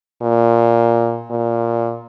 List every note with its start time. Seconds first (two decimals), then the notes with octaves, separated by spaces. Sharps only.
0.22 A#2
1.30 A#2